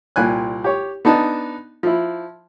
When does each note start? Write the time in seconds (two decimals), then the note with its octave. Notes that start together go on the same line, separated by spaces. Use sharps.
0.16 C2 A#2 G5 G#5 F#6
0.64 G4 C#5
1.05 B3 D4 D#4 A5
1.83 F3 E4